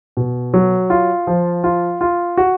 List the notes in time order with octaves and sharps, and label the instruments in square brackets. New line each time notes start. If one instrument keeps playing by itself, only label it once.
[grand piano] B2
F#3
F4
F3
F4
F4
F#4